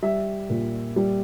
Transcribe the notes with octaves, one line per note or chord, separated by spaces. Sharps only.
G3 E5
A#2
G3